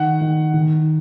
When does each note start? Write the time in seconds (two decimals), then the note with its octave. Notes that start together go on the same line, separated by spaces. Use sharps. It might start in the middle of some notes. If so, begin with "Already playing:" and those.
Already playing: D#3 F#5
0.21 D#3
0.54 D#3